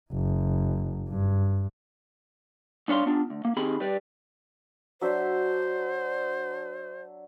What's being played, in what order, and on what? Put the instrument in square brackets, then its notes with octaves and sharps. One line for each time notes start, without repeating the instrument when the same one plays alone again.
[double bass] F#1
G2
[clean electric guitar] G2 D4 C#5 F5 C6
B3 D4 F4
D2
A#3
D#3 C4 G4 G#4 B5
G3 B4 D5
[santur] F#3 D4 E5 [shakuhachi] C5